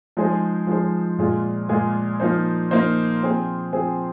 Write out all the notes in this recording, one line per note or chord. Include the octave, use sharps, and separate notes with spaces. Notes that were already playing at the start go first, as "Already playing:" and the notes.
F3 G#3 D#4 G#4 C5
F3 G#3 D#4 G#4 C5
A#2 G#3 F4 G#4
A#2 G#3 F4 G#4
F3 A#3 D#4 C5
F3 A#3 D#4 C5
F3 C4 G#4 C5
F3 C4 G#4 C5